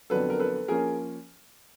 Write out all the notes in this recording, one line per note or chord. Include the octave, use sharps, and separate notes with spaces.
F2 D3 F#3 B3 A4 B4
A#4
A4 B4
F3 A#3 C#4 G#4 A#4